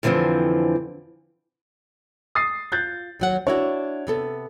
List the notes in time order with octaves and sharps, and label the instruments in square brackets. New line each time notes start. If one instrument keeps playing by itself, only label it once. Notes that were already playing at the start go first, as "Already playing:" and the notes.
[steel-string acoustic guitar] F2 D3 E3 F3 C4
[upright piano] D#6 A6 C7
[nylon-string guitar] F4 [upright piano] F#6 G6 A6
[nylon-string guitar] D#2 F#3 F#5
[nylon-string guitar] D4 E4 F#4 [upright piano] C#5
[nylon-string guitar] C3 B3 A4